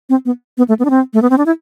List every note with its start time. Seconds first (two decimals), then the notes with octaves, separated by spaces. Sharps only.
0.09 C4
0.25 B3
0.58 B3
0.68 A3
0.79 B3
0.85 D4
0.90 C4
1.14 A3
1.22 B3
1.30 C4
1.38 D4
1.46 E4